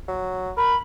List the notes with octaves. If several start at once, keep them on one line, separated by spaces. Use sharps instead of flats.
F#3
A#4 B5